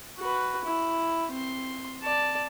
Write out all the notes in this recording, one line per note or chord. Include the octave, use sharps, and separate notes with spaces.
F#4 B4
E4
C4 C6
D5 A5